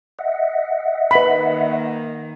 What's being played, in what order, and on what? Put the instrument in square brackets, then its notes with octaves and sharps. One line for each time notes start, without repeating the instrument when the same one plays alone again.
[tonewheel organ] D#5 E5 F#5
[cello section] D#3 A#3 [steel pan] B4 B5